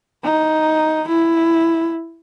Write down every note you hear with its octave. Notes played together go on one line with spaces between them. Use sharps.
D#4
E4